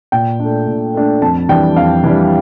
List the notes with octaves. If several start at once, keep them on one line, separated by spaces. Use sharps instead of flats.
A#2 G5
A3 D4
A#2
A3 D4
F2 A5
E3 G3 D4 G5
F2 F5
E3 G3 D4